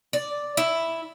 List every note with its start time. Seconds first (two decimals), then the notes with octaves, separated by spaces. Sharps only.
0.13 D5
0.57 E4